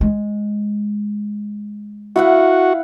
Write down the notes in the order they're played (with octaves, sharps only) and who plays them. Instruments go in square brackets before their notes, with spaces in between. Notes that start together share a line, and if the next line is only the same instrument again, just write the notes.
[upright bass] G#3
[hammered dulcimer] E4 F5 F#5 [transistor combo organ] F#4